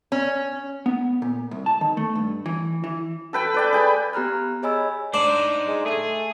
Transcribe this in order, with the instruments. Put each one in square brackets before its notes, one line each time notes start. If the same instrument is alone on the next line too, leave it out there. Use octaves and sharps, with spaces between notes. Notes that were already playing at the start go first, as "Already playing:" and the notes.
[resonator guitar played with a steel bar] C#4
[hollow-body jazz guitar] B3
A#2
C2
A5
D#3
A3
G2
E3
E3
[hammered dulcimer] A4 B4 G5
B4 D5 G5
G#4 G5 G#5 B5
[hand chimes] B3 G4 A#5 F6 F#6
G#4 C#5 D#5 G#5 B5 E6
[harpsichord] D4 [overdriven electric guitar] D#4 C5
[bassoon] G#3
[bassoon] A3 [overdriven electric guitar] G#4